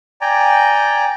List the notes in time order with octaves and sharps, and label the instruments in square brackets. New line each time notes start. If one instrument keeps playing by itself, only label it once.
[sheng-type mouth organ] D5 G5 G#5 A#5